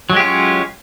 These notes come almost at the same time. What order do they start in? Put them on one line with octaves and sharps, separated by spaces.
F#3 G#3 G4 F4 C#4